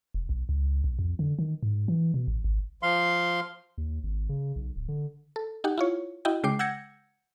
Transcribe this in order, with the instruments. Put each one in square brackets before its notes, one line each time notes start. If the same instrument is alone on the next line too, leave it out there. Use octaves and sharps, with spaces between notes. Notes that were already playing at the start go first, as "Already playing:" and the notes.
[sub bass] E1
B1
C#2
B1
F2
D3
D#3
G#2
E3
B2
A1
G#1
[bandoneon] F3 F5 C6
[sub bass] D#2
G#1
C#3
B1
D1
D3
[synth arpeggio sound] A4
D#4 G4 F#5
E4 F4 C#5
E4 F#4 D#5 G5
C#3 G#3 G5 D6 C7
F#5 E6 G6 G#6 A#6 C#7